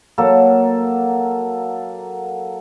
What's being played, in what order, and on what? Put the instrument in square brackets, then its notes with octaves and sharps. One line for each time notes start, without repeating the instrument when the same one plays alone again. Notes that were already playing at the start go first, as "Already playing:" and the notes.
[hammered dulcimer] F#3 A#3 A4